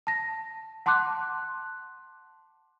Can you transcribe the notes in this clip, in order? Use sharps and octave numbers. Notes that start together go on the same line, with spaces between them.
A5 A#6
F#5 A5 C6 D6 F#6